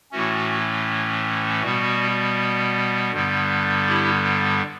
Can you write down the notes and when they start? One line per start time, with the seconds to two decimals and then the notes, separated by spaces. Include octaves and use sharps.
0.12 A2 E3 A3 C#4 F#4
1.62 B2 G3 B3 F#4
3.12 G2 D3 G3 B3
3.88 E4 G4